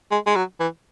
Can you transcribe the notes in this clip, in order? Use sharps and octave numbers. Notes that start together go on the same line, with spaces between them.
G#3
G#3
F#3
E3